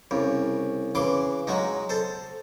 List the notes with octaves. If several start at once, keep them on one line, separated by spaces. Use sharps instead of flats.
C2 C#3
C#3 E3 C6 D6
F#3 G#3 D#4
A4 C5